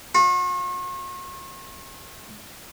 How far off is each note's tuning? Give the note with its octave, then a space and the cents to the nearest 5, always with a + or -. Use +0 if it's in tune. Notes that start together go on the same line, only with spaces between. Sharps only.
F#4 -45